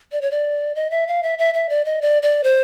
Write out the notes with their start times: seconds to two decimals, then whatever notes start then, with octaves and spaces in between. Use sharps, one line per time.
0.12 D5
0.21 C#5
0.31 D5
0.75 D#5
0.90 E5
1.07 F5
1.23 E5
1.38 E5
1.54 E5
1.69 D5
1.85 D#5
2.02 D5
2.23 D5
2.44 C5